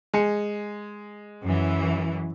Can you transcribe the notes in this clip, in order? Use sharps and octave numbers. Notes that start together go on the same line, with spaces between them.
G#3 G#5 C#7
F#2 E3